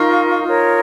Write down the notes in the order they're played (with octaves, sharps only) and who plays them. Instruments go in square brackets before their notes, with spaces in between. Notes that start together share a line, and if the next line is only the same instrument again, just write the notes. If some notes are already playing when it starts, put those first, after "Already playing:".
Already playing: [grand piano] D#4 [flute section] F4 A#4 F5 C#6
[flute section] F4 A#4 C#5